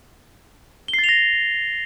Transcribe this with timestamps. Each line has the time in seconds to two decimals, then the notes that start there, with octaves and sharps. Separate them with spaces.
0.88 G7
0.93 C7
0.99 A6
1.04 F7
1.09 A#6